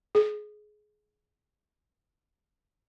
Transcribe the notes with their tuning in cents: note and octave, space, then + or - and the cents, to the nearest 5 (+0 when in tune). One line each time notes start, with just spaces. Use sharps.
G#4 +25